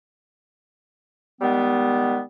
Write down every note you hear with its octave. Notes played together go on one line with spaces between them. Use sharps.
D#3 G3 G#3 B3